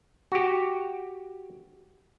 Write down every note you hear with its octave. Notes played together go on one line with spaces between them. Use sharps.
F#4 G4